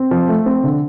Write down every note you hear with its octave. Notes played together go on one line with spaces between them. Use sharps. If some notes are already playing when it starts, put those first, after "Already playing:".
Already playing: C4
F3
A3
C4
D3